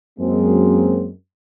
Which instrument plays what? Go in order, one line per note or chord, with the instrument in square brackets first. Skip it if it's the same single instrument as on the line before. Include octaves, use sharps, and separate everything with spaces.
[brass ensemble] F#2 G#3 A#3 C4